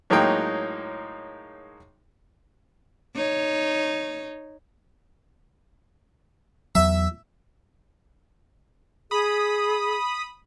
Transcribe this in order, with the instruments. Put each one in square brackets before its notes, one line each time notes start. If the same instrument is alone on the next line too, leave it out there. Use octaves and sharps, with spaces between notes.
[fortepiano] A2 F#3 G#3 A#3 D#4 G5
[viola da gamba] D#4 C#5
[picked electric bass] E2 F#3 [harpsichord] E5
[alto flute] G#4 [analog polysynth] B5 D#6